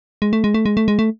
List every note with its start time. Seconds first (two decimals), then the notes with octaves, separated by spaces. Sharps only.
0.22 G#3
0.33 A3
0.44 G#3
0.54 A3
0.66 G#3
0.77 A3
0.88 G#3
0.99 A3